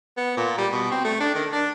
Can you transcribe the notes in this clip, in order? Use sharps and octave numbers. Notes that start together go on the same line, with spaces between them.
B3
A#2
G3
B2
C4
A3
D4
D#3
D4